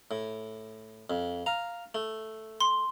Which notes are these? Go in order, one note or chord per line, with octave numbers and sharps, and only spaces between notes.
A2
F2
F5 A#5
A3
C6